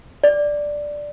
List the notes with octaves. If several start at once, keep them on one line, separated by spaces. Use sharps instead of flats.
D5